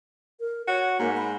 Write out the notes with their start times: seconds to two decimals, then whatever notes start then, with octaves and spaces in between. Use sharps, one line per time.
0.40 A#4
0.68 F#4 C#5
0.99 G#2 A#3
1.17 B5